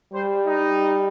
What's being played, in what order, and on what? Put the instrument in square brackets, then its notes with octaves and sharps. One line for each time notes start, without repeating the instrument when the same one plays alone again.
[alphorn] G3 [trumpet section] C5
[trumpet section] D#4